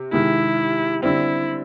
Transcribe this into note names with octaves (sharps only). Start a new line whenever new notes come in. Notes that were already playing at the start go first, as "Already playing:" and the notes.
Already playing: C3
C3 D#3 G#3 E4
D3 G3 C4 E4